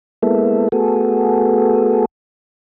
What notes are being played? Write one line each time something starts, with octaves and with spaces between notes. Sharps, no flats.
G#3 A#3 B3 E4 A4
A3 B3 F#4 G#4 A4